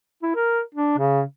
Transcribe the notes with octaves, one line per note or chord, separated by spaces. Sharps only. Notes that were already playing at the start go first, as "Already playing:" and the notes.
E4
A#4
D4
C#3